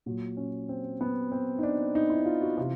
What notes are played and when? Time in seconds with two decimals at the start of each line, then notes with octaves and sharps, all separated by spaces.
0.06 A#2 F#3
0.37 C#4
0.69 C4
1.01 B3
1.32 C4
1.59 D#4
1.63 D4
1.95 D#4
2.10 E4
2.26 F4
2.42 F#4
2.58 C3 E3 F4